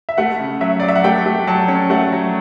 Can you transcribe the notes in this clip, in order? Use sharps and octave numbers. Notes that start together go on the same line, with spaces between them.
E5
A3 F#5
C#3
F#3 E5
D5
F#3
E5
F#5
A3 G5
A3
F#3 A5
C#4
A3 F#5
F#3